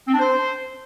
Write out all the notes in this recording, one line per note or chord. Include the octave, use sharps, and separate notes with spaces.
C4
D4
C5